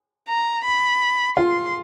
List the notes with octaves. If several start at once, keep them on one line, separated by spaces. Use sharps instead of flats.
A#5
B5
F4 C6